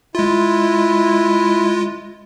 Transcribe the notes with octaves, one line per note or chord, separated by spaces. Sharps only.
G#3 E4 F4